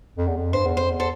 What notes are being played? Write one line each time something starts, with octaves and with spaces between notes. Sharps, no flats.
F2
E2
F2
G2 C5
E2
F2 C5
E2
A4 C5